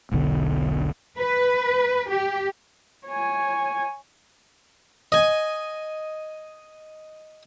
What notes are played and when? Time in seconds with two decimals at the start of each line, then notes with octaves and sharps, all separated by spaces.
0.12 E1 B1 B2 D3
1.18 B4
2.10 G4
3.07 C#5 G#5
5.12 D#5 G#5